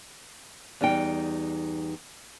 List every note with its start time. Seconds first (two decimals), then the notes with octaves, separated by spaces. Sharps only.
0.81 E2 G3 D#4 G5